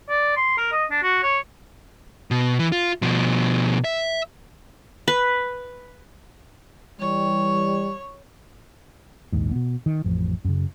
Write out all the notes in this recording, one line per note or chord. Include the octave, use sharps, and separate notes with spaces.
D5
C6
A#4
D#5
D4
F#4
C#5
B2
E3
F4
B2 F3
E5
B4
E3 G3 C#5
A#1 D#2 G#2
B2 B3
D#3
A1 F2 F3
F#2 C#3